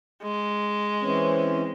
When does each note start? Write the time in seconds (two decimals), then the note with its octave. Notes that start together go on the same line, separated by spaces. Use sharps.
0.23 G#3
1.02 E3 C4 C#4